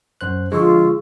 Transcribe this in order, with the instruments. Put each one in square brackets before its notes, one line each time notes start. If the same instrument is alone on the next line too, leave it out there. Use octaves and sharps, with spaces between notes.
[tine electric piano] F#2 C5 F#6
[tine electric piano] D3 F3 G#3 [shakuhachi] F4 [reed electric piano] G#4 C#6 E6